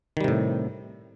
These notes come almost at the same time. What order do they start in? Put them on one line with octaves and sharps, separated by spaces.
D#3 G3 C3 A2